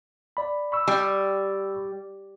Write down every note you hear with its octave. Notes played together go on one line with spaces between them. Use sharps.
D5 B5
B5 C#6 E6
G3